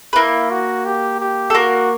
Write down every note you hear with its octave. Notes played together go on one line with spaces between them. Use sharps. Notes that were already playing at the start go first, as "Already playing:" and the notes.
B4
A#3 E4 A#4
F#4
G4
G4
A4
A#3 F#4 A#4